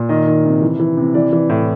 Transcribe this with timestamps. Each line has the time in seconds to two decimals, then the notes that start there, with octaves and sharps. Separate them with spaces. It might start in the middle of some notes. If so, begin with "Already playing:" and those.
Already playing: A#2
0.09 D#3 D#5
0.27 D#3
0.45 C3
0.62 E3
0.80 E3
0.97 C3
1.14 E3 D5
1.33 E3
1.50 A2